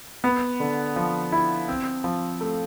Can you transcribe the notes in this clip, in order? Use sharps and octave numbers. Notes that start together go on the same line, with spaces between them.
B3
D3
F3
E4
C4
F3
A3